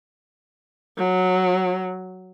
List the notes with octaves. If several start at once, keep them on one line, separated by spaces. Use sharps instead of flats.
F#3